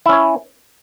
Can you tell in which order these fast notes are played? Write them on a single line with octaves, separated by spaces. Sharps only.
E4 C#4 C#5